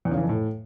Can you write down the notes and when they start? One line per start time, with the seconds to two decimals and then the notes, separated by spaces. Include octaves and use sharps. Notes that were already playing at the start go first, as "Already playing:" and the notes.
0.05 E2
0.11 C#3
0.17 E3
0.23 F2
0.29 A2